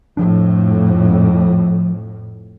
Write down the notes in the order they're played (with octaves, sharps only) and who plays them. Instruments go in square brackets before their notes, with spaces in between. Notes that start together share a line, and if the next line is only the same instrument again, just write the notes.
[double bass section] F2 A2 [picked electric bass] F3 D4